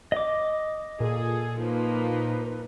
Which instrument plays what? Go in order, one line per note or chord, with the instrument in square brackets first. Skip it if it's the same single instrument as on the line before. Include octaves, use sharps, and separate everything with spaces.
[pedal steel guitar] D#5 D6
[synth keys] A#2 [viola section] G#4 A4
[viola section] F3 A#3 [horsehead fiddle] D#4 B4